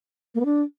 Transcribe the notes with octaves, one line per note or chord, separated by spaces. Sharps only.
A#3
B3
D4